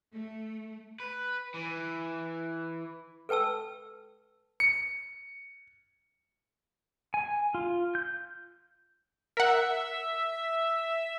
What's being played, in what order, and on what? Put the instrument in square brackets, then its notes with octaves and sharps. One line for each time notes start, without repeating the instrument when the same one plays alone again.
[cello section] A3
[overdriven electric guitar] B4
E3
[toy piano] A4 B4 G5 A5 E6
[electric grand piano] C#7
[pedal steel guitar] G#5
F4
G6
[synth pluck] A#4 F#5 [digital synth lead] E5